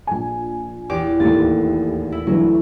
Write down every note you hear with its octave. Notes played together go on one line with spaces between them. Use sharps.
A#1 G#5
E2 G4 D6
D#2 A2 A6
E4
D2 E3 F#3